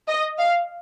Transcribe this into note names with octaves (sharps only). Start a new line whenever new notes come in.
D#5
F5